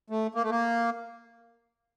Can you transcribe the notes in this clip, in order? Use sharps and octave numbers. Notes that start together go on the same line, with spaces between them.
A3
A#3
A3
A#3